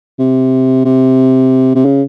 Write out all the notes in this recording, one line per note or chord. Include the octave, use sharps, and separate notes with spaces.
C3
C3
C3
C#3